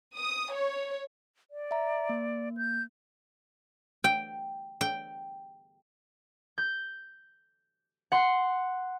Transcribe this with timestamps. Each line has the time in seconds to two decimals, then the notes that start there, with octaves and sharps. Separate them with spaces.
0.17 D#6
0.53 C#5
1.51 D5
1.71 E5 A#5
2.09 A#3
2.57 G6
4.04 G5
4.81 G5
6.58 G6
8.12 F#5 C6